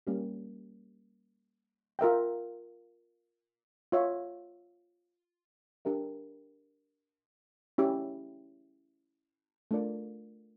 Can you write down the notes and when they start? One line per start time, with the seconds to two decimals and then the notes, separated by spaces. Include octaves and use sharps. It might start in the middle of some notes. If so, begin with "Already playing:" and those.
0.07 G3 A#3 C#4 G4
1.99 F4 A#4 E5 G5
3.92 F4 C#5 E5
5.85 D4 G4 A#4 E5
7.78 C#4 E4 G4
9.71 A3 D4 F4 A#4 D5